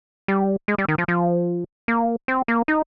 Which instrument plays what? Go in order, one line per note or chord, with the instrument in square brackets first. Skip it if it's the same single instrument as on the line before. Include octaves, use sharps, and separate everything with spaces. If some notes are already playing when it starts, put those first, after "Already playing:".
[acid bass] G3
G#3
G3
D#3
F3
F3
A#3
C4
A#3
D#4